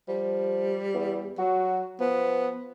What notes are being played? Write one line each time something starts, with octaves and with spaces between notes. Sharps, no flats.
F3 G3
E2
F#3 F#4
F3 B3